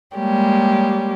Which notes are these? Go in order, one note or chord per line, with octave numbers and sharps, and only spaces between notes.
G3 G#3 A#3 G4 C#5